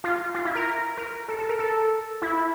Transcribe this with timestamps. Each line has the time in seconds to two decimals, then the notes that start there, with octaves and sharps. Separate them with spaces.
0.04 F4
0.34 F4
0.45 E4
0.55 A#4
0.97 A#4
1.28 A4
1.39 A4
1.49 A#4
1.59 A4
2.22 E4